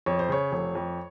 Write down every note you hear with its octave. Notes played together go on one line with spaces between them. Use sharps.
F2 C#5
C5
C#3 C#5
F1
F2